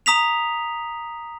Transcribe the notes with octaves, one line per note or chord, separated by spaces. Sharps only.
A#5 D#6 B6 F7